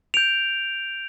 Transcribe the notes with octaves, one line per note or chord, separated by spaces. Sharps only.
G6 D7 F7